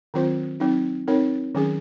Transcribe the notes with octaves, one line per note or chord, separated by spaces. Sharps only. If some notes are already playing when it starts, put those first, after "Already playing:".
D#3 F#3 C4 F4 C5
F#3 C4 D#4
C4 D#4 A#4 C#5
D#3 F#3 C#4 G#4